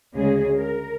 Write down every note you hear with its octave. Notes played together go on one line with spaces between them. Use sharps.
D2 C#3 G#3 G#4
A#4